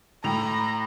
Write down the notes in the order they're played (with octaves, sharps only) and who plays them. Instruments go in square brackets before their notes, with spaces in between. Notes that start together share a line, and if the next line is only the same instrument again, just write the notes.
[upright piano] A2 G5 F7 [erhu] A#5